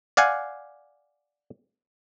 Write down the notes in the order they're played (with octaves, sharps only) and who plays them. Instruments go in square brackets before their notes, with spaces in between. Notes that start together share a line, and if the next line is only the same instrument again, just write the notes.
[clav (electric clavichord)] D5 F5 F#5 G#5